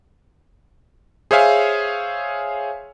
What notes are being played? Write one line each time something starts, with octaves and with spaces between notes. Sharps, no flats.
G#4 C5 C#5 E5 F5 G#5